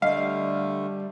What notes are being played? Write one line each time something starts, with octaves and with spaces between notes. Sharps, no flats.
D3 G3 A3 D#5 F5